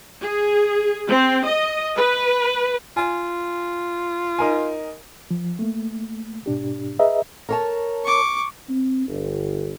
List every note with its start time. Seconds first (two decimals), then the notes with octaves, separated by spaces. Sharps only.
0.21 G#4
1.08 C4
1.45 D#5
1.97 B4
2.97 F4 G#5
4.39 D#4 A#4 G#5
5.31 F3
5.59 A3 A#3
6.46 G#2 B2 D4 G4
6.99 G#4 B4 D#5 E5 A#5
7.49 A#4 C#5 A5
8.04 C#6 D6
8.70 C4
9.08 G1